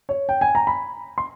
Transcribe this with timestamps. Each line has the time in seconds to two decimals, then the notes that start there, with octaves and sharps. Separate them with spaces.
0.09 C#5
0.29 G5
0.41 G#5
0.55 A#5
0.67 B5
1.18 C6